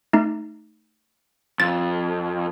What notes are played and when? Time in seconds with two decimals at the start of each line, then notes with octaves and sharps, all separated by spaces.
0.13 A3 D#4
1.60 F2 A6